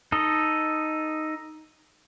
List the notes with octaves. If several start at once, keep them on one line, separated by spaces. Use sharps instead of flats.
D#4 A4 D#5